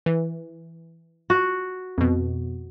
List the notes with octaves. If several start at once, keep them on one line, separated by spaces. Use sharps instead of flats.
E3
F#4
F2 B2